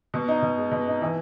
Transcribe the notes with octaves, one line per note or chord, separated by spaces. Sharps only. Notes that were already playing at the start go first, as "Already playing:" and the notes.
B2
D#4
B2
G#3
B2
D#4
E3